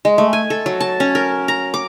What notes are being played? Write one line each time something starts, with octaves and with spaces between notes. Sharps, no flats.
G#3
A3
G#5
A4
F#3
A5
C#4
A#4
A#5
D6